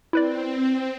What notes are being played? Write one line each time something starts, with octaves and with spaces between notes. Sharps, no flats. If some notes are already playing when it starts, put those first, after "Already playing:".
C4 E4 B4 D5